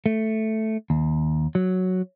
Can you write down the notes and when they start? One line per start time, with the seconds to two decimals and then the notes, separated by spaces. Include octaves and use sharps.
0.06 A3
0.90 D#2
1.55 F#3